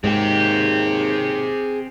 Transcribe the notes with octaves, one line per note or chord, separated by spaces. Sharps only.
D#2 G#2 C4 G4 G#4 G5